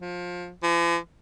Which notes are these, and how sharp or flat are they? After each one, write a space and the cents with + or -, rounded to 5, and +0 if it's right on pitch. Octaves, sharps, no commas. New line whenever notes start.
F3 +25
F3 -45